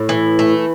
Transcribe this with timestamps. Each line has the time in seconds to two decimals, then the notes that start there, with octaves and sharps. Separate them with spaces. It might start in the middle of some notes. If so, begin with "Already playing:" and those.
Already playing: A2
0.09 E3
0.39 A3